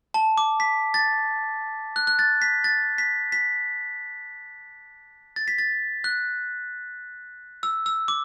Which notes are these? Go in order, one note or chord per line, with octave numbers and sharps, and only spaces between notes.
A5
D6
B6
A6
F#6
F#6
A6
B6
A6
B6
B6
A6
B6
A6
F#6
E6
E6
D6